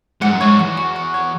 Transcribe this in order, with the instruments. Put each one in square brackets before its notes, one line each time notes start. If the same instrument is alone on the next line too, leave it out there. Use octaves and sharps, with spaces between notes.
[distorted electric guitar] G#2 [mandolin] F#5
[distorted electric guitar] F#2
[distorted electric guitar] G#2 [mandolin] C#5
[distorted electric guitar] E2 [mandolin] F#4
[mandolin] F#4
F#5
C#5